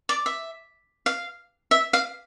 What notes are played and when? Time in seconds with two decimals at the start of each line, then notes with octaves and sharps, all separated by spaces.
0.09 D5
0.26 E5
1.06 F5
1.71 E5
1.93 F5